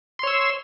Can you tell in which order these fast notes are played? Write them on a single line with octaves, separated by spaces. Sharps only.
C6 C#5 E6